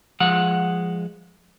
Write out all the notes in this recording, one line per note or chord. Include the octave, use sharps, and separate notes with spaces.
F3 G#3 F#5